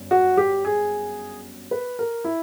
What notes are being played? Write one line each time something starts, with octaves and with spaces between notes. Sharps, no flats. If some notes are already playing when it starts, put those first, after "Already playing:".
Already playing: G1 F#2
F#4
G4
G#4
B4
A#4
E4